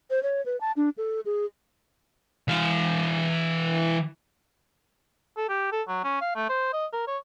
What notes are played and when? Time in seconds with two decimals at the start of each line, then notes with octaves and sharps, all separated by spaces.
0.10 C5
0.23 C#5
0.46 B4
0.61 A5
0.77 D4
0.98 A4
1.25 G#4
2.48 E3 F5
5.37 A4
5.49 G4
5.72 A4
5.88 F#3
6.04 C#4
6.22 F5
6.35 A3
6.49 C5
6.73 D#5
6.93 A#4
7.07 C#5